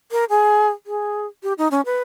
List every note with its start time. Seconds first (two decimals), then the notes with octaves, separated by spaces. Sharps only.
0.11 A#4
0.30 G#4
0.86 G#4
1.43 G4
1.58 D#4
1.71 C#4
1.85 B4